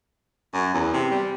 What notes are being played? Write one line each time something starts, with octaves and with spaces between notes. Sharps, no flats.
F#2
E2
C3
G3